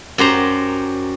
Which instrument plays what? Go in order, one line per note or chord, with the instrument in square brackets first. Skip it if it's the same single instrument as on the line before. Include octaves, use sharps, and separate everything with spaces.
[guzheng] F#2 G4 C5 A#5